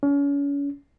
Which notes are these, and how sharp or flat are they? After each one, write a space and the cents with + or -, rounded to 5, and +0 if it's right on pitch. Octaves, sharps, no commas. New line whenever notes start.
C#4 +35